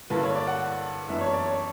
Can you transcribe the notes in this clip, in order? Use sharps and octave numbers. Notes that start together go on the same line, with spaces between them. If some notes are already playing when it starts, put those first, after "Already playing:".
G2 D3 A#3 E4 B4
C#5
D5
F#5
F#1 F#2 E3 B3 D4 E5
C#5
D5
C#5